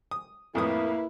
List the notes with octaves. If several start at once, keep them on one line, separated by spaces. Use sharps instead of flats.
D#6
F2 A2 A#3 E4 B4 D#6